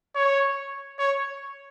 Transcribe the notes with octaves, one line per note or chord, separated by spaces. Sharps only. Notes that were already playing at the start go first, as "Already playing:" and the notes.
C#5
C#5